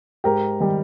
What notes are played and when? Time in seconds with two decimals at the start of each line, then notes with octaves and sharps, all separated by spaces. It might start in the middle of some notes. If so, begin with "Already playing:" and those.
0.24 G#2 G4 A#4
0.60 D#3 G3